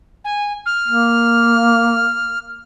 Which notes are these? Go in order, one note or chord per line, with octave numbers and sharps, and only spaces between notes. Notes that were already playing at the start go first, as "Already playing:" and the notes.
G#5
F6
A#3